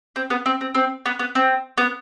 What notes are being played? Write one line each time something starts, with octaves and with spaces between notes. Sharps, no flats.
C4
B3
C4
C4
C4
B3
B3
C4
B3